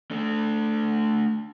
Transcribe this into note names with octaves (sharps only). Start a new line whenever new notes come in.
A3 D4